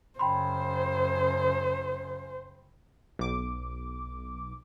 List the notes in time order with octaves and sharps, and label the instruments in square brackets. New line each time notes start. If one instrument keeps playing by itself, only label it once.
[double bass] F#2 C#3 [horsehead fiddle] C5 [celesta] G5 B5 C6
[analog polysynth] B1 D6